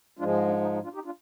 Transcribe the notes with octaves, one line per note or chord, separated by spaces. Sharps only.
G#2 F3 G#3 D4 F4
D4
D#4
D#4
D4 F4
D#4 G4
D4 F4